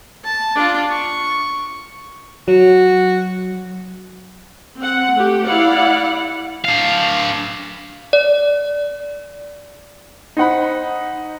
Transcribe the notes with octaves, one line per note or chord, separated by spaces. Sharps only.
A5
D4 F4
C#6
F#3 F#4
C4 F#5
A3 G4
E4 D5 F5 F#5
D4 F5
D5
D#4 C5 F#5 B5